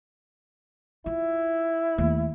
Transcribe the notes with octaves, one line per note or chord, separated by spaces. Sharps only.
E4 F4
D#2 A3